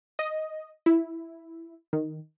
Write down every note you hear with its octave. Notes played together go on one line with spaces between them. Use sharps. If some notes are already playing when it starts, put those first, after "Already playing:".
D#5
E4
D#3